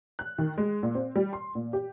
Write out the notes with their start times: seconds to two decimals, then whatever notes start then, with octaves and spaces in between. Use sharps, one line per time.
0.19 F#6
0.38 D#3
0.58 G#3
0.83 A#2
0.95 C4
1.16 G3
1.33 C6
1.55 A#2
1.73 G4